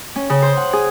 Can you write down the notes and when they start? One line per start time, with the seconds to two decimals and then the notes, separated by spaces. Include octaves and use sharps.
0.16 C#4
0.30 C#3
0.42 C5
0.57 F#5
0.73 G#4